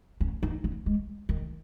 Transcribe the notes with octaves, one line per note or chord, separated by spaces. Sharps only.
C#4
D#4
C#4
G#3
D#3